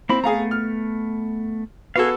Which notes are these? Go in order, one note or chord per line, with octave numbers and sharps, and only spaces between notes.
A#3 C4 E4 B5
A3 B3 G#4 F5 A#5
F6
B3 F#4 A4 F5 G#5